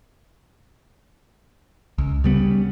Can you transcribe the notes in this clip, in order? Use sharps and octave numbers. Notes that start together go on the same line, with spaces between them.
C#2
C#3 G3 B3